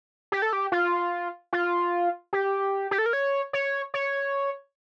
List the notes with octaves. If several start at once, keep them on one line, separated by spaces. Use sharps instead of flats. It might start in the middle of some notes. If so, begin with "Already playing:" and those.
G4
A4
G4
F4
F4
G4
G4
A4
A#4
C#5
C#5
C#5